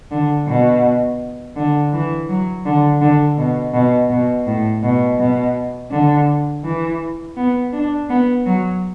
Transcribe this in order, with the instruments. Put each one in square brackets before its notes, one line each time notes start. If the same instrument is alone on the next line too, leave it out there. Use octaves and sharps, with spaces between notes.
[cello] D3
B2
D3
E3
F#3
D3
D3
B2
B2
B2
A2
B2
B2
D3
E3
B3
D4
B3
F#3